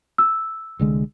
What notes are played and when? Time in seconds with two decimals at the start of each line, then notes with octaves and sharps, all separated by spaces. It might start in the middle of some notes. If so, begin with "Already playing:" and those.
0.18 E6
0.79 C2 D3 G#3